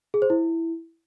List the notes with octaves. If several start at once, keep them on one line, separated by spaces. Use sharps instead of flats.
G#4
C5
E4